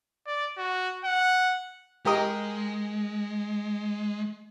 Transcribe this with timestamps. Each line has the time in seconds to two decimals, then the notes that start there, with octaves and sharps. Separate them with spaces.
0.27 D5
0.58 F#4
1.05 F#5
2.05 G#3 G4 A#4 D#5